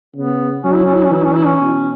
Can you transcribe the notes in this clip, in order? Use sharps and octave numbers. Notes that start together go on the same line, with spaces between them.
C#3 B3
F#3 C#4
E4
C#4
E4
C#4
E3 E4
C#4
E4
C#4
B2